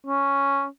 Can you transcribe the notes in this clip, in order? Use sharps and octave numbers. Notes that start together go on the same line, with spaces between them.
C#4